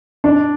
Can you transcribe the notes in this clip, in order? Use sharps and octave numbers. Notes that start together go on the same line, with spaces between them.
D4